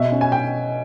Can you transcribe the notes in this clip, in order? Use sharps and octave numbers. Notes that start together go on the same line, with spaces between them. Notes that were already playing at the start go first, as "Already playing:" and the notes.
Already playing: B2 E5
C#4
G#5
G5